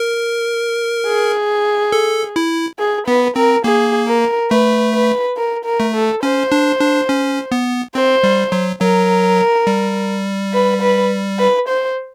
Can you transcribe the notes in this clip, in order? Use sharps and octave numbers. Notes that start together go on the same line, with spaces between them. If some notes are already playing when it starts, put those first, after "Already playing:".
Already playing: A#4
G#4
A4
E4
G#4
B3 B4
C4 A#4
A#3 G#4
A#4
A3 B4
B4
A#4
A#4
A3
A4
C#4 C5
D4
D4
C#4
B3
C4 C5
G3
F#3
F#3 A#4
G3
B4
B4
B4
C5